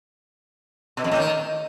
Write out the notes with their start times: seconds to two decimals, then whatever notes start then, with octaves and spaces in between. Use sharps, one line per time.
0.97 B2
1.04 F2
1.11 A2
1.19 D#3